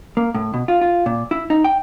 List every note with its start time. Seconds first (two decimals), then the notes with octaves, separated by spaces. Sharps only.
0.17 A#3
0.35 A2
0.54 B2
0.68 F4
0.81 F4
1.06 A#2
1.31 E4
1.50 D#4
1.64 G5